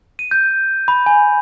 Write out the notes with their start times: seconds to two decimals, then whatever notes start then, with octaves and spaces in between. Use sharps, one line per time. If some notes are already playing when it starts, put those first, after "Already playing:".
0.19 D#7
0.31 G6
0.88 B5
1.06 G#5